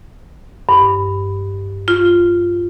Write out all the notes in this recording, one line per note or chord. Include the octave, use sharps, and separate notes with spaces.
G2
F4